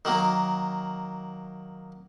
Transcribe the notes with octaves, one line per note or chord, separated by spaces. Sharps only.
D#3 F#3 A#3